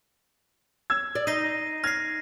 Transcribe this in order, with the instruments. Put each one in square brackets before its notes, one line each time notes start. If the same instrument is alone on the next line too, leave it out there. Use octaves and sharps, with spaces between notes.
[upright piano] E6 G#6
[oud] D5
[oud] D#4 [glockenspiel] A#6 C7 D#7
[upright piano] F6 G#6 [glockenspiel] A#6 C7